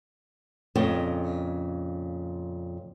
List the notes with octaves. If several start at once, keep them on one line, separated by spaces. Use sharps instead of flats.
F2 A#2 C#3 D#5 G5